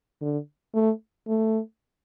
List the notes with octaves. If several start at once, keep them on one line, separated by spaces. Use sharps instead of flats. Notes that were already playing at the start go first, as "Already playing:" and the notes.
D3
A3
A3